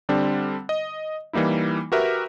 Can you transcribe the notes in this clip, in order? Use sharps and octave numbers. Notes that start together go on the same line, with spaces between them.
D3 G3 C4 D4
D#5
E3 G3 A#3 D#4 E4
F#4 G4 A#4 B4 E5